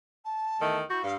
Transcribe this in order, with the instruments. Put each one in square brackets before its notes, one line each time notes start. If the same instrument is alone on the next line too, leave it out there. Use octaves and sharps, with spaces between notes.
[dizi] A5
[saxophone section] E2 D#3 A3
[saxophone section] E4 F#4 [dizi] G6
[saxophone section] G2 [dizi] F5